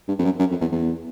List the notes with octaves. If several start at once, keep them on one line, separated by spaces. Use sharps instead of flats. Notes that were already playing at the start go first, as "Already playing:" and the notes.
G2
F2
F#2
F#2
F2
E2
E2